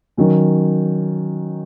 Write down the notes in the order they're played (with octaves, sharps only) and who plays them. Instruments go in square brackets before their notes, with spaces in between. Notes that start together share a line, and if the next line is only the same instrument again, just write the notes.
[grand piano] D#3 F#3 C#4